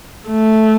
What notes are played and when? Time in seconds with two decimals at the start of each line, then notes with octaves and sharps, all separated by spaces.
0.28 A3